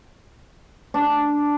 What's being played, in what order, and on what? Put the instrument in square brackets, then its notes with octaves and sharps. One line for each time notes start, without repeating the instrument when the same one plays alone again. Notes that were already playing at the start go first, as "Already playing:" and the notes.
[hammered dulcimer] D4